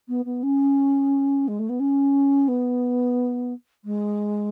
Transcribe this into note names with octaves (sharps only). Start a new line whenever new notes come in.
B3
B3
C#4
G#3
A3
B3
C#4
B3
G#3